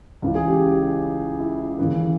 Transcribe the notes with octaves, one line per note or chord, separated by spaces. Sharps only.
C#2 C#3 E3
G#4
G4
E4
D#2 C#3 E3